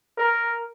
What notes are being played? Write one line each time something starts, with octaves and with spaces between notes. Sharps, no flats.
A#4